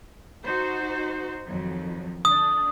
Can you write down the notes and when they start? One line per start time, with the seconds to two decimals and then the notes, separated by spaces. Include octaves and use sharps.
0.46 D#4 F#4 C5
1.47 F2 D#3 F#3
2.25 D3 D4 D#6